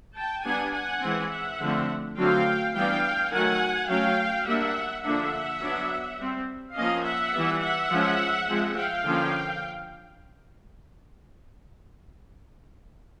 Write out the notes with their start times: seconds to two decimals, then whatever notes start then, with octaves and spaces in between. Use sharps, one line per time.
0.16 G5 A5
0.44 G3 B3 D4 F#5 G#5
0.73 F#5 G#5
1.02 E3 G#3 C4
1.30 E5 F#5
1.60 D3 F3 A3 C4
2.17 D3 F#3 A3 C4 F5 G5
2.74 E3 G3 B3 D4 F5 G5
3.31 D#3 F#3 A3 F#5 G#5
3.88 F#3 A3 C#4 F5 G5
4.46 G3 A#3 D4 E5 F#5
5.04 D3 F3 A#3 D4 E5 F#5
5.61 F#3 B3 D4
6.18 G3 C4
6.75 F3 A#3 C#4 D#5 F5
7.04 E5 F#5
7.33 E3 G3 B3
7.62 E5 F#5
7.90 F3 G#3 C#4
8.49 F3 G#3 C4
8.76 F5 G5
9.05 D3 F3 A#3 C#4